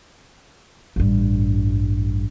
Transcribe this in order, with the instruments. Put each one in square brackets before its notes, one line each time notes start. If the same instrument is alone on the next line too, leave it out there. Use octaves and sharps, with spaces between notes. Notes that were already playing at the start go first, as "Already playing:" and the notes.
[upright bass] A1 G2